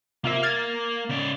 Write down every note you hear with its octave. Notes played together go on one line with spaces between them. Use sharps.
C3 A#3 F4 E5
F6 G#6 A6
C#3 D5